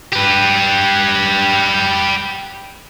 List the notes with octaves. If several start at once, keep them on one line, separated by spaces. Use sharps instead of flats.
G4 B4